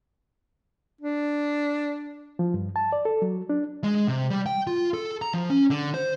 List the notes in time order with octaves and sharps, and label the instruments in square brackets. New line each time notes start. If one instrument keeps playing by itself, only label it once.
[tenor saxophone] D4
[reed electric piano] F3
G2
A5
D5
A4
F#3
D4
[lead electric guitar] G#3
C3
G3
G5
F4
A4
A#5
F3
C#4
D3
C5